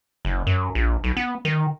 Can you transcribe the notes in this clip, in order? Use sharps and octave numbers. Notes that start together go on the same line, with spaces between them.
F#1
F#2
A#1
B1
B3
D#3